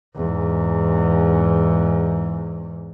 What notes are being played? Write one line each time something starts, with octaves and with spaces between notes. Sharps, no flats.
E2 G#2